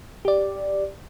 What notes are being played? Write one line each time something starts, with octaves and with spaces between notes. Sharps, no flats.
G4 D5